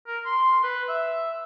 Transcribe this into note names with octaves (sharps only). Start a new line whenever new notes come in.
A#4
C6
B4
E5